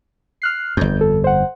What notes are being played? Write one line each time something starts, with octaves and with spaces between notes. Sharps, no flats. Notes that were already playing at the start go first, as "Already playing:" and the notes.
F6 F#6 C7
G1 F2 G6
A4
C5 F#5